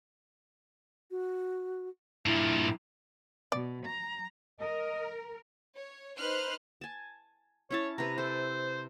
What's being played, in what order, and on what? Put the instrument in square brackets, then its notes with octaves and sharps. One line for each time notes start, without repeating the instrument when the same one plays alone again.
[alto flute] F#4
[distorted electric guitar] G2 A#2 [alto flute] E4
[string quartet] B2 [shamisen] D5
[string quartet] A#5
[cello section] A#4 [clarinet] D#5
[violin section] C#5
D#4 B4 C5 F6 F#6
[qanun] G#5 A5
[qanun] C#4 E4 A5 [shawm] C#5
[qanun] C3 B4 [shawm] A#5
[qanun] A4 [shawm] C5